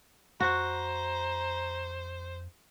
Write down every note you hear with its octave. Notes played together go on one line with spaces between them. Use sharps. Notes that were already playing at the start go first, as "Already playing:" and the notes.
F2 F#4 C5 A#5